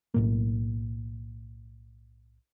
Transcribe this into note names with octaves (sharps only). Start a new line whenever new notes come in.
B1 A2 A#3